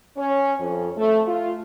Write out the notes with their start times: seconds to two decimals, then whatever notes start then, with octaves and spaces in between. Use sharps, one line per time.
0.17 C#4
0.59 F2
0.98 A3
1.27 F4